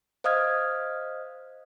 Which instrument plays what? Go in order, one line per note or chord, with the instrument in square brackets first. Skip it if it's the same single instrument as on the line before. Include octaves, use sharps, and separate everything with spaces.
[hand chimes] C5 D#5 F5 D#6 F6 G#6